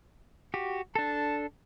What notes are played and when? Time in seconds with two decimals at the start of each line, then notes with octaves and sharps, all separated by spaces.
0.54 F#4 G4
0.95 D4 A4 A5